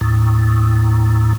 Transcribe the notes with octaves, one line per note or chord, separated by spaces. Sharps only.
D#2 A2